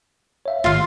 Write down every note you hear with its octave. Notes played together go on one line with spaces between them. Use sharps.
C#5 E5 F5
A1 G#2 D#3 F4 F5